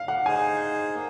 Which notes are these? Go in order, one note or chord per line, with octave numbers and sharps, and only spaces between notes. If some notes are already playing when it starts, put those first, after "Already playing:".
Already playing: F5
F#5
D#4 G#4 C5 G#5
A#3